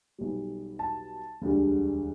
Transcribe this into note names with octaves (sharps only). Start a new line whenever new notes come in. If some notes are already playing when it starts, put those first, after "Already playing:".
B1 B2 G3
A5
E1 D2 D3 G3